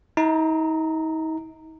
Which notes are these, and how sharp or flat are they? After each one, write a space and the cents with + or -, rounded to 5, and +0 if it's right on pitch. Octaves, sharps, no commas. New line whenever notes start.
D#4 +40 A#5 -15